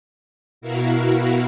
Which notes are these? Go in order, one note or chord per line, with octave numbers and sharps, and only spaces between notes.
B2 E4 F#4 A#4 F5